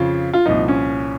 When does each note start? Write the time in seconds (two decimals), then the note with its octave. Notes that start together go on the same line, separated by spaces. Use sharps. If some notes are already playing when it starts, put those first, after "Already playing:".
Already playing: F2 C#3 F3 F4
0.33 F4
0.46 C2 A#2 F3 D#4
0.68 C#4